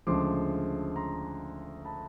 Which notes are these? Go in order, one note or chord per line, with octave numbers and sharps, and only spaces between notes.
D2 C#3 F3 G#3 C6 D6
A#5 C6
A5 B5